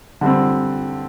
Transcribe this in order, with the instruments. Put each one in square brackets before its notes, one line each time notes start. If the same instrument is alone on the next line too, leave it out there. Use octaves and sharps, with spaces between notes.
[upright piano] D3 G3 C4